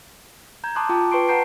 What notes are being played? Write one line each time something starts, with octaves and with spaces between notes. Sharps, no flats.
A#5 G6 G#6
A5 A#5 C6 D6 D#6 F#6
F4 G5 A5 D6
B4 G5 C6 C#6 C7 D7
F#5 A5 A#5 G6 C7 D7